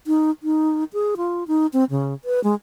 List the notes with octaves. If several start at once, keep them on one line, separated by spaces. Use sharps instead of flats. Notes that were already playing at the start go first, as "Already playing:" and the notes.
D#4
D#4
G#4
F4
D#4
C4
C#3
B4
G#3